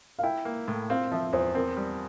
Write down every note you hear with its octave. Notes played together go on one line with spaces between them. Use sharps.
F5
E4 G5
A#3
A2
C4 F5
F3 E5
E2 C5
C4 A#4
G3